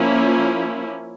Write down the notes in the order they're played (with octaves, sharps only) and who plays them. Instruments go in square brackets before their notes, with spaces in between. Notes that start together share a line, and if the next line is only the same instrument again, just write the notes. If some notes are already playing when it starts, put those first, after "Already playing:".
Already playing: [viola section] F3 A#3 C#4 E4